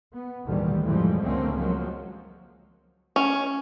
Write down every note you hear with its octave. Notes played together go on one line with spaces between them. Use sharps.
B3
G#1 D2 A#2 D#3 E3 G3
F2 A2 E3 F3 G3 G#3
C#2 D3 A3 A#3 C4 C#4
F3 F#3 G#3 A#3
C#4